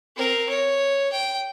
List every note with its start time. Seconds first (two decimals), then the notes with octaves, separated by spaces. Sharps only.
0.16 C4 A#4
0.50 C#5
1.13 G5